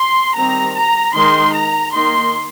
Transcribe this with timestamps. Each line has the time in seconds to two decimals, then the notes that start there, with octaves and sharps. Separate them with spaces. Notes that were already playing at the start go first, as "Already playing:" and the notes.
Already playing: C6
0.36 D#3 G3 C4 A#5
0.75 A#5
1.15 D#3 G#3 D#4 C6
1.54 A#5
1.93 D#3 A#3 D#4 C6